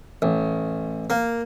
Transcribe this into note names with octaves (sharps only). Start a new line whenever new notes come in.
A1
A#3